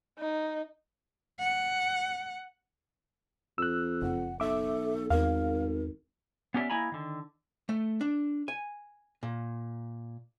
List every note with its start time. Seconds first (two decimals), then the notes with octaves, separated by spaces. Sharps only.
0.19 D#4
1.39 F#5
3.58 F2 E6 F#6
4.02 F#1 F#5
4.40 B1 A4 E5 D6
5.10 G#1 E2 A#4 F5
6.54 B3 C#4 G4 G#4 D5 E5
6.70 A#3 E4 D#5 G#5 A#5 B5
6.92 D3 D#3
7.69 A3
8.01 D4
8.48 G#5
9.23 A#2